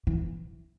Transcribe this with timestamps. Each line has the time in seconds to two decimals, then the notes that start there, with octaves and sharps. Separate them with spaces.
0.07 E3